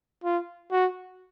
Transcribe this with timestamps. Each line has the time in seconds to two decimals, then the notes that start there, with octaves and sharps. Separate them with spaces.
0.24 F4
0.72 F#4